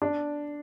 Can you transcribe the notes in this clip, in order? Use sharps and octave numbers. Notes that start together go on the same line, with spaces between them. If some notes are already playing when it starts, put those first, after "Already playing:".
D4